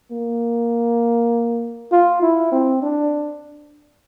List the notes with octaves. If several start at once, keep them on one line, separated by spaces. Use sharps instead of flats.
A#3
F4
E4
C4
D4